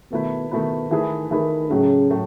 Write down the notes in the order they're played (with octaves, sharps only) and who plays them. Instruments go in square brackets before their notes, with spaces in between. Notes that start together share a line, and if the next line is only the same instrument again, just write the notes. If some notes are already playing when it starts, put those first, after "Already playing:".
[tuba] B2 [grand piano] D#3 A3 E4 B4
[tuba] B2 [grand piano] D#3 A3 E4 B4
[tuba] D#3 [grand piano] E3 A3 E4 G#4 B4
[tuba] D#3 [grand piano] E3 A3 E4 G#4 B4
[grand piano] A2 F#3 A3 [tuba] C#3
[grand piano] A2 F#3 A3